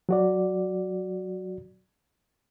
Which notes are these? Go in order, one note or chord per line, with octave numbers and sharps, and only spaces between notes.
F#3 F#4 D5